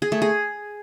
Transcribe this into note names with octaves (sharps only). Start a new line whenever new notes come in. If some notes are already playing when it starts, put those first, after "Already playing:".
G#4
A3
G#4